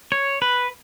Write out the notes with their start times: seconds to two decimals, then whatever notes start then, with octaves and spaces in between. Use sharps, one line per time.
0.12 C#5
0.42 B4